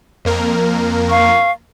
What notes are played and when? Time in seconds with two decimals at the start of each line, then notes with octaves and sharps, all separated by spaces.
0.25 F2 A#3 A#4
1.09 F5 C#6